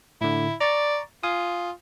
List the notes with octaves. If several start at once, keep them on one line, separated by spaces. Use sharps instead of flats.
A2 D3 E4
D5 A#5 C#6 A6
F4 F5 G#5 D#6